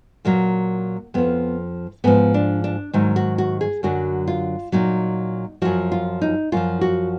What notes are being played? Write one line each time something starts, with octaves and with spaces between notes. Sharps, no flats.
A#2 F#3 A#3
F2 F3 B3
G#2 F3 B3
D4
D4
G#2 D#3 F#3 D#4
F#4
F#4
G#4
F#2 D3 F#3 F#4
F4
A#2 F#3 D#4
F#2 F3 F#4
F4
D#4
F#2 F3 F4
F#4